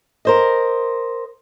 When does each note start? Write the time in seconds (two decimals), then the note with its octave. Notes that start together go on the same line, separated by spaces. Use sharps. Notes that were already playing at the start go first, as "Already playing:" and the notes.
0.25 A#4 C5 D#5